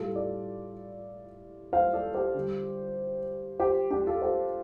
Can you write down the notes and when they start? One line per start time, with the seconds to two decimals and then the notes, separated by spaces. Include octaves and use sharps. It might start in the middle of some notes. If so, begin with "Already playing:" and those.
Already playing: A2 G3 F4 A4
0.16 A4 D5
1.73 C5 F5
1.93 A4 D5
2.14 G4 C5
2.34 D3 G3
3.60 G4 C5
3.90 D4 G4
4.07 F4 A4
4.22 G4 C5